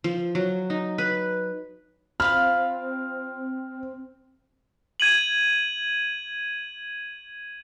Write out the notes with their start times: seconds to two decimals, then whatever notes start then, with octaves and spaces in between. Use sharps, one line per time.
0.04 F3
0.35 F#3
0.70 D#4
0.98 B4
2.20 C4 F4 F5 B5 F6
5.00 G#6 D#7 F#7